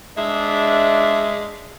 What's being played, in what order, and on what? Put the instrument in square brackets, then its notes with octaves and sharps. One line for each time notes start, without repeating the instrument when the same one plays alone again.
[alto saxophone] G#3 [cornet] D4 [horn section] E5